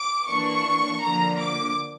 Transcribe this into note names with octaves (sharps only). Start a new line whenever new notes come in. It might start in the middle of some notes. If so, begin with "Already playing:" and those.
Already playing: D6
E3 A#3 D4 C#6
D3 F3 A#3 A#5
D6